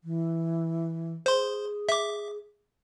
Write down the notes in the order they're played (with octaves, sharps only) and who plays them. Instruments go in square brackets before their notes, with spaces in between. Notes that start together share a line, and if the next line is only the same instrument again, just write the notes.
[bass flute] E3
[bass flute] G#4 [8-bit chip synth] C5 C6
[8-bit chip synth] E5 D6